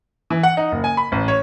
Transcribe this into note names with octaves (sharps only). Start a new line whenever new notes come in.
E3
F#5
D#4
F#1
G#5
B5
A1
C#5